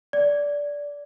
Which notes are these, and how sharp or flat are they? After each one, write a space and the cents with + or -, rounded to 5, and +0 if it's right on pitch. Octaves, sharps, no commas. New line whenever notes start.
D5 -15